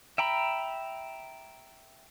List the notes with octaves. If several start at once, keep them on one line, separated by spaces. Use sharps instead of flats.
E5 G5 A#5 B5